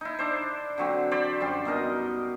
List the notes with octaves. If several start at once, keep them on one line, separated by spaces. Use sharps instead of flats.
D#4 E4
D4 C5
D3 F#3 C4
C5 D5 B5
F#2 G3 C6
B2 D#4 A#4 D#5